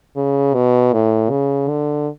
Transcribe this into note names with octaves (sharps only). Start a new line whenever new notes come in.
C#3
B2
A2
C#3
D3